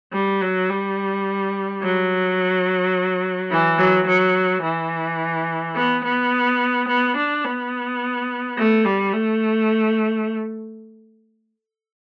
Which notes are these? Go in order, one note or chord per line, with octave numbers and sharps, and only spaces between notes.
G3
F#3
G3
F#3
E3
F#3
F#3
E3
B3
B3
B3
D4
B3
A3
G3
A3